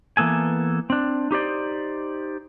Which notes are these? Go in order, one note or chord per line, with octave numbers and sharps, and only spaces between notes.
E3 A#3 B3 A4 G#5
C4 D4
D#4 G4 C5 D5